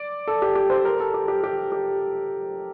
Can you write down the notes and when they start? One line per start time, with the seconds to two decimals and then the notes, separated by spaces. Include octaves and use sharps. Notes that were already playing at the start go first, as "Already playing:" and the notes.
Already playing: D5
0.28 A4
0.42 G4
0.55 G4
0.70 C5
0.85 A#4
1.00 A4
1.14 G4
1.28 G4
1.44 G4
1.72 G4